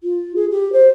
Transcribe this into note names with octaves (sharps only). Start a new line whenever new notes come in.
F4
G#4
G4
C5